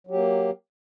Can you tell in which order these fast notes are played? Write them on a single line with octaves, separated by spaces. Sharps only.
F#3 G4 A#3